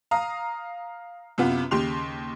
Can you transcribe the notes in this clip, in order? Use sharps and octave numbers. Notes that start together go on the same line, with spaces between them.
F5 A#5 D#6
F#2 C3 B3 F4
D#2 C#3 G4 C6 F7